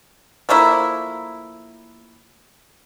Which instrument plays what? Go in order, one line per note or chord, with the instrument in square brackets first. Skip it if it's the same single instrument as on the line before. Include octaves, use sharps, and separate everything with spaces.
[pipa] F3 A3 A#3 E4